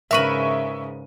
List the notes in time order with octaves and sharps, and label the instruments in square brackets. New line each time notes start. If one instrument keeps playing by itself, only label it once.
[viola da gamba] G#2 C#3 [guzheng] A#4 B4 B5 [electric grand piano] E5 C#6 D#7